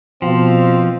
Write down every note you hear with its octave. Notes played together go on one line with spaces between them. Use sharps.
B2 F3 C4 F5